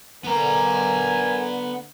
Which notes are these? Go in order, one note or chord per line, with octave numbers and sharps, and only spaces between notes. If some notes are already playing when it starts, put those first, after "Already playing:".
D3 B3 A#4 G#5 A#5